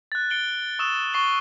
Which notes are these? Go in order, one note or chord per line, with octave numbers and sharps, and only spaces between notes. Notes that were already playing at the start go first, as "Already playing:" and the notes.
F#6 A6
C#7 D7 G7
C#6 D#6 E6 E7
C#6 C7 G7